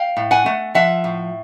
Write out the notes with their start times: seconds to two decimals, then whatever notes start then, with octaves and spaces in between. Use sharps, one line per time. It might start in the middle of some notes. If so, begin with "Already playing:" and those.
Already playing: F5 G5
0.17 A2
0.31 F#5 G#5
0.46 A3
0.75 F3 E5 F#5
1.04 A2